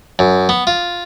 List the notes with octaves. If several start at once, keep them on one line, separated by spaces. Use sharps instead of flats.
F#2
B3
F4